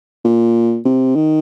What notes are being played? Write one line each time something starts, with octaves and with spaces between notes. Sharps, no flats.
A#2
C3
D#3